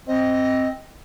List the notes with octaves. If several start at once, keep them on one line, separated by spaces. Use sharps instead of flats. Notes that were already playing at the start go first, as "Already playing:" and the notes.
C4 D#5